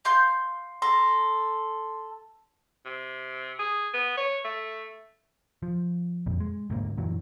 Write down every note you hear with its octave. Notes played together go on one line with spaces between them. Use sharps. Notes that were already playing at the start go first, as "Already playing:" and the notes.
F5 C6 G6
A4 A#5 C6
C3
G#4
B3
C#5
A3
F3
F2 A#2
G#3
D2 G#2 A3 A#3
F#2 A#2 E3 F#3